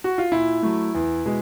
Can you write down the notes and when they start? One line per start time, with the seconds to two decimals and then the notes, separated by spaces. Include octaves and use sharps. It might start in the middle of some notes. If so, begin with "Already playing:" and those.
0.04 F#4
0.18 F4
0.32 A#2 E4
0.63 F#3 A3
0.95 E2
1.25 B2 G#3